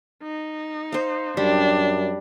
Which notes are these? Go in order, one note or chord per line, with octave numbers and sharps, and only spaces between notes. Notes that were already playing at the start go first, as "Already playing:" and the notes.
D#4
C5 F5
F#2 G3 D4